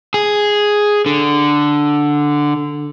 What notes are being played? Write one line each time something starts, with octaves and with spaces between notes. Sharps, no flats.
G#4
D3